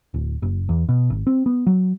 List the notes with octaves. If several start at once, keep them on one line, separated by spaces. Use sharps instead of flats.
D1
F#1
E2
B2
G#1
C4
B3
F#3